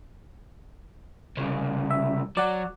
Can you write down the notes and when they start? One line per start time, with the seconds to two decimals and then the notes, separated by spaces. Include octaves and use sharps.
1.37 C2 C#3
1.90 E5
2.37 F#3 D5 F#5